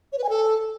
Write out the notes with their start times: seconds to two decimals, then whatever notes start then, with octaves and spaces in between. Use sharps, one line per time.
0.12 C#5
0.18 B4
0.24 G#5
0.29 A4